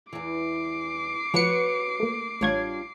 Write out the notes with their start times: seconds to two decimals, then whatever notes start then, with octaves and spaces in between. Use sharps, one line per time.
0.13 E2 E3 D6 C7
1.34 F3 F#4 B4 C#5 C#7
2.00 A3 A#3
2.41 A1 G3 D4 F4 C#5 G#6